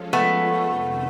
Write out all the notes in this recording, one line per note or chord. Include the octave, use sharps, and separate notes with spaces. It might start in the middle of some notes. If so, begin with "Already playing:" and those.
Already playing: F3 G#3 C#4 F4 A4
A3 B3
F2 C3 D#3